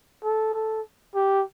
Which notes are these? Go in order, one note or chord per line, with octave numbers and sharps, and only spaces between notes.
A4
A4
G4